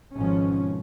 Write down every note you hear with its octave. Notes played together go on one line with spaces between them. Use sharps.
G#1 G#2 B2 F3 C#4